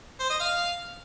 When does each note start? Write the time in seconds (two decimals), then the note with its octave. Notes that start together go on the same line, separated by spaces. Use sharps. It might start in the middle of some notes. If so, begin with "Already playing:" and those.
0.20 C5
0.30 D#5
0.40 F5